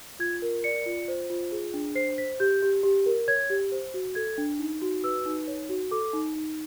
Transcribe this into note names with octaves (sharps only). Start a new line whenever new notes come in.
F4 G#6
A#4
D5 C#7
F4
C5
F4
G#4
D4
C5 C7
C5 B6
G4 G6
G4
G4
A#4
C#5 G#6
G4
C5
F#4
A4 G#6
D4
D#4
F#4
B4 E6
D#4
C#5
F#4
A4 D6
D#4
D#4